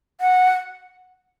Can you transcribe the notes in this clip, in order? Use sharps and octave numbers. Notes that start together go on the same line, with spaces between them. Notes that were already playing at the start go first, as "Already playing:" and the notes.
F#5